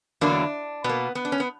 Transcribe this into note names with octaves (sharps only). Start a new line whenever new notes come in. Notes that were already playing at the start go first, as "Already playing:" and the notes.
E2 D3 F#3 A#3 D4
B2 A#3 B3
B3
D4
C#4
B3